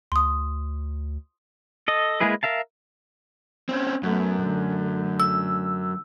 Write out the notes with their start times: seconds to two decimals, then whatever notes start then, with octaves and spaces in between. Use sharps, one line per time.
0.12 D2 C6 D#6
1.88 A4 D#5
2.20 G#3 A#3 E4 G#4 B4
2.43 A#4 E5 F5 A5
3.69 C4 C#4
4.03 F#2 A3 B3
4.40 D3 A3
5.20 E6